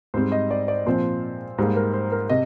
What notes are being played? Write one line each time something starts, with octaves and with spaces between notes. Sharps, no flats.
G#2 G3 C4 C5
D#5
D5
D5
A#2 F3 C4 C5
G#2 G3 A#3 C5
A#4
C5
A#4
C3 D#5